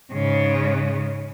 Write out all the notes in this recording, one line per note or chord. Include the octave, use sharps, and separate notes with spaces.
G#2 C#3